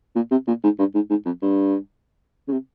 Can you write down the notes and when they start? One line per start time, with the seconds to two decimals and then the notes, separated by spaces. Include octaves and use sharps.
0.15 A#2
0.31 C3
0.47 A#2
0.64 G#2
0.79 G2
0.95 G#2
1.10 G#2
1.26 F2
1.42 G2
2.48 C#3
2.52 C3